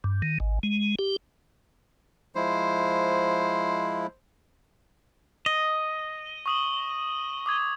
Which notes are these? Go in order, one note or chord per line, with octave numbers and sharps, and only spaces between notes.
G2
D#3
G#1
G#3
G4
F3 G#3 E4 C5
D#5
C#6 D#6 F#7
D6 D#6 G#6